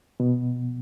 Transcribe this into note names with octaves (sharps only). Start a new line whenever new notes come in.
B2